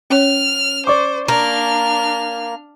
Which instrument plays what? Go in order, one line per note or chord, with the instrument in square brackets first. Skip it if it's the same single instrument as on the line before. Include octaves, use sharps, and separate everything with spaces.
[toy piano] C#4 C#5 [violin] F6
[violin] C5 [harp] D5 C#6 D6
[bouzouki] A#3 [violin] D4 F6